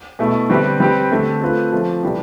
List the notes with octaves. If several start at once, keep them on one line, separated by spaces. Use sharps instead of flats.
B2 A3 E4
D3 G3 C4 G4 B4
G3 C4 G4 B4
D3 A3 C4
A3 C4 F4 B4
F3 A3 C4
C3 E3 G3 D4 G4